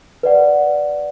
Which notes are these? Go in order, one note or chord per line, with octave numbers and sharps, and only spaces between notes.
B4 D5 F#5